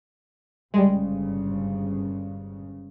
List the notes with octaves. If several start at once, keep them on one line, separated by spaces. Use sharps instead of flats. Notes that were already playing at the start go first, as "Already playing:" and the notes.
G1 G#2 C#3 G3 G#3